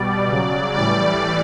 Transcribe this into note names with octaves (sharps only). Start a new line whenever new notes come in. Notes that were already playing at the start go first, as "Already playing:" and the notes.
Already playing: B2 G3 D5
C#3 F#3
A2 E3 G3 D5